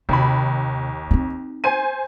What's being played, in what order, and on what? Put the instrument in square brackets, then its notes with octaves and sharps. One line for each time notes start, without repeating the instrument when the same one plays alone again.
[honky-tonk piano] D#2 B5 [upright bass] C3
[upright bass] C4 D#4
[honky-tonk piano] C5 G#5 D#7